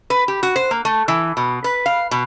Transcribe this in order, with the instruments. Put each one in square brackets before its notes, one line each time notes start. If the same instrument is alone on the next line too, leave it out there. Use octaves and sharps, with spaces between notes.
[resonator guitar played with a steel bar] B4
G4
F#4
C5
A#3
A3
E3
B2
B4
F5
B2